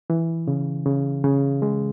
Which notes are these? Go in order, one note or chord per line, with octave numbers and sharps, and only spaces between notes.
E3
C#3
C#3
C#3
G#3